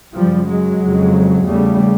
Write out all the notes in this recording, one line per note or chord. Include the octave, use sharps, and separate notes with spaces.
F#2 C#3 F3 G3
F#3 G#3
F2 C#3
E2 C#3 G3 A3